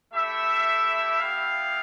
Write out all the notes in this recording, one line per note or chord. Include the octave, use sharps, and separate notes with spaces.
A3 E4 G4 E5
G3 B3 E4 G4 F5